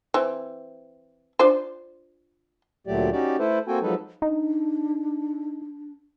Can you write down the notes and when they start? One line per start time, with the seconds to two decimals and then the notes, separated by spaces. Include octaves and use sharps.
0.14 E3 C4
1.39 D4 F4 C5
2.87 D2 A#2 F#3 A3 G4 D5
3.12 C#4 D#4 F#4 G4 D5
3.39 A3 E4 A4 B4 C5
3.68 A#3 C4 F#4 A4 G5 G#5
3.82 F3 F#3 G#3 D#4 A4 B4
4.22 D4 D#4